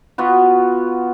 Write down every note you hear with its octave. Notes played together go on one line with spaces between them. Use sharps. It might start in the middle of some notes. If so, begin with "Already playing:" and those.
B3 F4 F#4